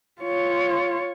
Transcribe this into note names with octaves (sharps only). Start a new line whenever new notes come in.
F4 C#5